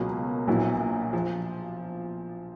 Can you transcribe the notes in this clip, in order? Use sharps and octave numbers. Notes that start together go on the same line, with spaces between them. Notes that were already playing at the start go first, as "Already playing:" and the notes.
Already playing: C#2 B2 F#3 A#3
A#1 A#2 F#3 B3 E4
F3